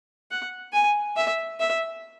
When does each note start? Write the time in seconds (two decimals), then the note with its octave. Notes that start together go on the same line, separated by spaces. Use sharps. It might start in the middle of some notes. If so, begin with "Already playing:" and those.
0.31 F#5
0.73 G#5
1.16 E5
1.60 E5